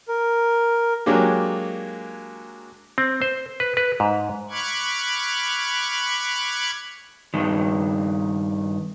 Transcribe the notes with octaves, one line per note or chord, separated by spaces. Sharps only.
A#4
F#3 G#3 A#3 D4 G4
C4
C5
B4
B4
G#2
B5 C#6 D6 F6 F#6 G#6
G2 D#3